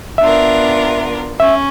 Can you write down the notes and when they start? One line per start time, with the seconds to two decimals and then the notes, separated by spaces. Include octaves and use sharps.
0.18 B3 D4 F4 A#4 E5
1.40 C#4 E5